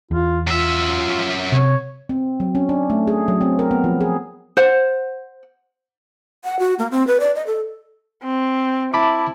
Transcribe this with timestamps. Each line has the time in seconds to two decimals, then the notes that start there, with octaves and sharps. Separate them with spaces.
0.11 E2 F4
0.47 F#2 F4 E5
1.52 C3 C#5
2.09 C4
2.40 F#3
2.55 C#4
2.69 D4
2.90 A3
3.07 G#4
3.28 F#3
3.41 C4
3.59 A#4
3.71 B3
3.84 F3
4.01 G#4
4.57 C5 F#5
6.44 F#5
6.59 F#4
6.79 A#3
6.91 C4
7.07 B4
7.20 D5
7.35 D#5
7.46 A4
8.23 C4
8.94 E4 A5 B5 D6